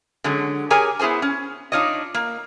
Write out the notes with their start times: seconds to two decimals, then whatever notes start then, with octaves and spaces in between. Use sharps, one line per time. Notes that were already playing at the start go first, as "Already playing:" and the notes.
0.24 D3 F#3 G#3 C#4
0.70 G4 G#4 A#4 C#5 G#5
0.99 B3 E4 G#4 C5 G#5
1.22 C#4
1.72 D4 D#4 F4 C#5 D#5
2.14 A#3